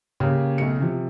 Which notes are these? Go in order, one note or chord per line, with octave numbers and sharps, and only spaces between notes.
C#3 A#3 C#4 G4
B1 A3 C#7
C3 F3